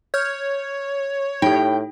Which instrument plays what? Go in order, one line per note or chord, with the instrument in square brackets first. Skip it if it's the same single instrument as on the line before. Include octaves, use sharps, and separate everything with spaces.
[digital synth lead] C#5 [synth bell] F6 G6 G#6
[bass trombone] A2 [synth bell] D#4 G4 [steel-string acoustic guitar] G5